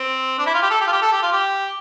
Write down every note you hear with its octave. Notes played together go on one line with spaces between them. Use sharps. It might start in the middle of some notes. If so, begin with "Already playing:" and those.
Already playing: C4
D4
E4
F4
G4
A4
G4
F4
G4
A4
G4
F4
G4